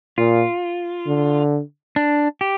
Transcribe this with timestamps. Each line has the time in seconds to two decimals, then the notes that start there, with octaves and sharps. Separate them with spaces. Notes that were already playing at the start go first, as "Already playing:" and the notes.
0.18 A#2 F4
1.07 D3
1.96 D4
2.41 G4